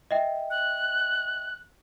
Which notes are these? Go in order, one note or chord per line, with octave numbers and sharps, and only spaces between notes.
D#5 E5 G5
F#6